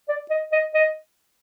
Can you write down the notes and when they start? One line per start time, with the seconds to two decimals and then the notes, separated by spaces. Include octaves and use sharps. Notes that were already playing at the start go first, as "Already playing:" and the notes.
0.09 D5
0.30 D#5
0.52 D#5
0.74 D#5